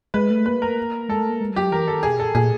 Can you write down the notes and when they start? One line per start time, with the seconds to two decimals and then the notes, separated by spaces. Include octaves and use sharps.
0.14 G#3 B4
0.30 A3
0.46 A#3 B4
0.62 A#4
1.09 G#3 A4
1.19 A3
1.29 A#3
1.41 G#3
1.50 G3
1.56 F#3 G4
1.72 E3 A#4
1.87 D#3 A4
2.03 B2 G#4
2.19 A#2 A4
2.35 A#2 G#4